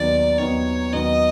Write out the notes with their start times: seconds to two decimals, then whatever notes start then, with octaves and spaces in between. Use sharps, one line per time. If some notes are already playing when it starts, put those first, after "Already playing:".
Already playing: D#2 D#3 F#3 B3 D5
0.38 D#2 D#3 F#3 B3 C#5
0.92 D#2 D#3 F#3 B3 D#5